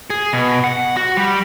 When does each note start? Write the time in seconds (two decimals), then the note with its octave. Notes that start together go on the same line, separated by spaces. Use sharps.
0.10 G#4
0.33 B2
0.64 F#5
0.97 F#4
1.17 G3